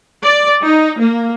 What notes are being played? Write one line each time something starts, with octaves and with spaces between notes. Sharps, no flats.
D5
D#4
A#3